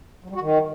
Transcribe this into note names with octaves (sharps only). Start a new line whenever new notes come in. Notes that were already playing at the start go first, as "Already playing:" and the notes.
F#3
G3
F#4
D#3